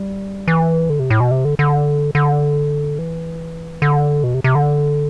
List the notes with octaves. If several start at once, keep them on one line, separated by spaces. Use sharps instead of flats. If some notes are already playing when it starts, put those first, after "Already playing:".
Already playing: G3
E3
D3
C3
A2
B2
C3
D3
D3
D3
E3
D3
B2
C3
C3
D3